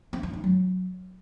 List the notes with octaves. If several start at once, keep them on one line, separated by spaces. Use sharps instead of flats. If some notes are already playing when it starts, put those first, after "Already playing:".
C4
D4
D#4
F#3